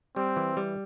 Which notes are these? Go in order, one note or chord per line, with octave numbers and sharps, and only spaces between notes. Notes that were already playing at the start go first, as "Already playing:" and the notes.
G3 C4
E3
G3